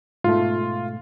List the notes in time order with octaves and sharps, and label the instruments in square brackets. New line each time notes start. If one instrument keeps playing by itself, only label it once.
[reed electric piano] G#2 B2 A3 [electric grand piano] F4